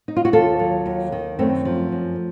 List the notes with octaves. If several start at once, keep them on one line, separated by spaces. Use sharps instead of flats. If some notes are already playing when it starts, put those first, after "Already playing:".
D#4
F4
F#4
D#2 F4 A4
F#3
D#2
D#3
F#2 A3 C4
F3
F#2